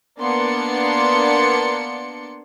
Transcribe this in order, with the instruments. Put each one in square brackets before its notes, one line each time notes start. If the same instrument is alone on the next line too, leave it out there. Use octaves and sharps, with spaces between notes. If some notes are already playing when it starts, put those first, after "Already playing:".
[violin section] A#3 B3 D4 D5 C6 C#7